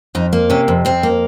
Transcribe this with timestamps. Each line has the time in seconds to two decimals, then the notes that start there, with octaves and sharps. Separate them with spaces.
0.15 F2 D#4
0.33 A#3
0.50 C3 C#4
0.68 F2
0.85 F2 C4
1.03 A#3